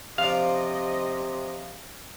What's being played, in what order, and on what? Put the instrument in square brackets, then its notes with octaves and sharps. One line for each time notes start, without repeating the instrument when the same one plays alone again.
[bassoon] C3 [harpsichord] F3 D4 [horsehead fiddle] D#5 [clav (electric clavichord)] F5